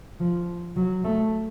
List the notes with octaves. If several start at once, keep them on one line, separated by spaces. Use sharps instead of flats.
F3
F#3
A3